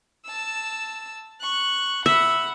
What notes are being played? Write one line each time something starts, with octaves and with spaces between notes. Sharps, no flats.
A5 E6
C#6 F#6
E5 F#5 B5